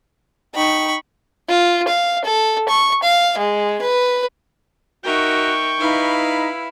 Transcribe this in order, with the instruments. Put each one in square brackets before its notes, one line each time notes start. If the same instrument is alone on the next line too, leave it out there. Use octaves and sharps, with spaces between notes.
[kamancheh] D#4 G5 [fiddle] B5 C#6
[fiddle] F4
F5
A4
C#6
F5
G#3
B4
[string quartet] D#4 A#4 E5 [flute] F#4 [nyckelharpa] G5 C#6
[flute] D#4 [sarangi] E4 [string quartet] B4 F5